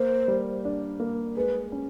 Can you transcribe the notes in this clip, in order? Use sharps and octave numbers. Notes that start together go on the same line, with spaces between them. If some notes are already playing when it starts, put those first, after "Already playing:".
Already playing: A#3 C5
G3
D4
A#3
G#3 B4
C#4